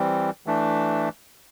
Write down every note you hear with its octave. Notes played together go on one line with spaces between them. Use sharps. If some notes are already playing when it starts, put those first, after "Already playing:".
Already playing: E3 G3 C4
E3 A3 D4